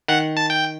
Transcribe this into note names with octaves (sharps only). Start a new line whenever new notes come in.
D#3 F#5
A5
G5